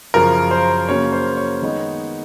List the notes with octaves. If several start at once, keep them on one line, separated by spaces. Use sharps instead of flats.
F#2 C#3 F3 A#4
C5
C#3 F#3 A#3 C#4 C#5
C5
C#5
D#3 G#3 B3 D#4